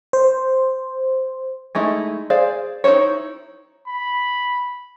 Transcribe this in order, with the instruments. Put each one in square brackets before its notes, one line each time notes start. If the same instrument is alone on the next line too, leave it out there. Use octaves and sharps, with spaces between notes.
[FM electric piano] C5
[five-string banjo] G#3 A3 D#4 E4
G#4 C5 D5 F5
D#4 E4 A4 C5 C#5
[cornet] B5